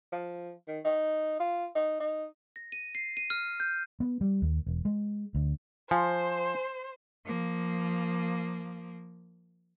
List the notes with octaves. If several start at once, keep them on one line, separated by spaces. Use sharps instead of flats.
F3
D#3
D#4
F4
D#4
D#4
A#6
D#7
C7
D#7
F6
G6
B3
G3
D#2
E1
G#3
D2
F3 C5 G#5 C6
F3 A#3